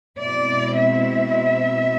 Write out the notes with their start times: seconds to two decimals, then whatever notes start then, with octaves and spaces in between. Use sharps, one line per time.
0.19 B2 G#3 C4 E4 D5
0.78 E5